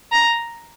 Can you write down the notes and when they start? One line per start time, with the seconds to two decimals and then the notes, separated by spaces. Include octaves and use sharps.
0.12 A#5